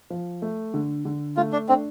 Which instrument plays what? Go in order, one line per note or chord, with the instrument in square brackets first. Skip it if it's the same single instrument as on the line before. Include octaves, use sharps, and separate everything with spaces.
[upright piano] F3
A3
D3
D3
[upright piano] A3 [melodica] F4
[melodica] D4
[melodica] C4 [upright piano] D4